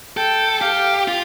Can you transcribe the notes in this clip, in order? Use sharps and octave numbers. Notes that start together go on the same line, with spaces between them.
A4 G5
G4 F5
F4